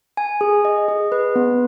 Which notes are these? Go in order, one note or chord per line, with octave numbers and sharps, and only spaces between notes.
G#5
G#4
D#5
G#4
B4
B3